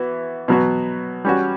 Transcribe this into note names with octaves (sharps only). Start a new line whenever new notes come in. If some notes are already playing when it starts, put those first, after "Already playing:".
Already playing: E3 B3 F#4
B2 F#3 B3 F#4
G3 C#4 F#4